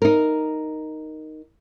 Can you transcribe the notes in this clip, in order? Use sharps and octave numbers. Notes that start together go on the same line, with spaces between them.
D#4 A#4